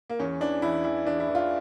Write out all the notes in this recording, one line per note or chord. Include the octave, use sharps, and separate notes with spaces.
A#3
E2 C#4
E3 D4
E2 E4
E3 E4
E2 D4
E4
E3
F4